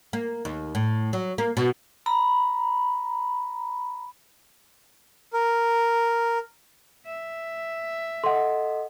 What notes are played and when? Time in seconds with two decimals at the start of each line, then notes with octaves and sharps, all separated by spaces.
0.13 A#3
0.45 D#2
0.75 A2
1.13 F#3
1.38 A#3
1.57 B2
2.06 A#5 B5
5.33 A#4
7.06 E5
8.24 A4 D#5 F#5 C6